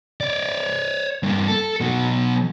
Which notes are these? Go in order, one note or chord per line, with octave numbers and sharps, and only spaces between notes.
C#5 D5
G2 A#3
A4
B2 F#3